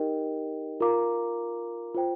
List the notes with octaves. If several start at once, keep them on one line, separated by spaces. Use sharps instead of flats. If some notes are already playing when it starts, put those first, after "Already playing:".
Already playing: D#4 G4 A#4 D#5 G5
F4 A#4 F5 A#5 D6
F4 C5 G5